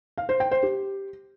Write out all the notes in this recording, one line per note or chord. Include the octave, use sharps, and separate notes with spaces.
F5
C5
G5
C5
G4